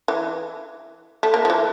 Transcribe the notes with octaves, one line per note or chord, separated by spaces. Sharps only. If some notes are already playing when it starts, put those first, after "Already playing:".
E3
A3
A#3
F3
E3